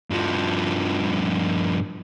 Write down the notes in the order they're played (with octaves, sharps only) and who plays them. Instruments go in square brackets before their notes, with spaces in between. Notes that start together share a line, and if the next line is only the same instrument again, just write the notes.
[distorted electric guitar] G2 F3